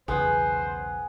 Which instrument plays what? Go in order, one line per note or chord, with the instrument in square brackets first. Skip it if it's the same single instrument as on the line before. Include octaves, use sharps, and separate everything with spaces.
[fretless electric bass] B1 E2 C#3 [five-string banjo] B3 [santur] G#4 F#5 [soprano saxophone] C5